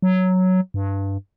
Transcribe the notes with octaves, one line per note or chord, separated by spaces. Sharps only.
F#3
G2